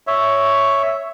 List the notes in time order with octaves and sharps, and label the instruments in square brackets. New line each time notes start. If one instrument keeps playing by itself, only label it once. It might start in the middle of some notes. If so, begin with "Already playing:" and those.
[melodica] C#5 E5